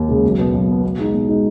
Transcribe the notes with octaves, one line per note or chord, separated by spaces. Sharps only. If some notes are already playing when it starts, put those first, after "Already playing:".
Already playing: D#2
C#3 G#3
B1
B2 B3
B1
B2 B3
B2
G#3 D#4
B2
G#3 D#4